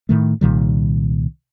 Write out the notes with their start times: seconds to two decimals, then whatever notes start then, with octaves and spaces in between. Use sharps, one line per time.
0.09 A2 D#3 A3
0.41 C2 A#2 D#3 G3